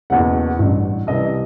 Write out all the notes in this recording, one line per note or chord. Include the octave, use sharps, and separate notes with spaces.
F#1 E2 B2 F#5
A1 G2 E3
C2 C3 E3 D#5